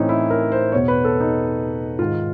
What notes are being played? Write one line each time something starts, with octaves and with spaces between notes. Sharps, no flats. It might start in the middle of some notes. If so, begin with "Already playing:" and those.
Already playing: A2 E3 C4 C#4 D#4
E4
A#4
C5
E2 B2 C#5
B4
A4
D#4
G#2 D#3 F4